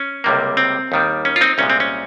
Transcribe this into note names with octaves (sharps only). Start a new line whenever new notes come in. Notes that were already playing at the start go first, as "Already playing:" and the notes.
Already playing: C#4
C#2 C3 G3 A#3
C4
D#2 D#3 G3
C#4
F4
C4 D#4
C2 A#2 G#3 C#4
C4
C#4